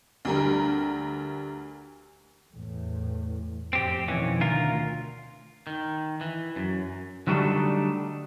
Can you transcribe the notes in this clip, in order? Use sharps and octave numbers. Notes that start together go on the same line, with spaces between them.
D2 G3 A#4
E2 A2
F2 A2 C4 G4
F2 B2 D#3 E3 C#4
D2 F4 A#4
D#3
E3
F#2
D3 F#3 G3 A3 D4 D#4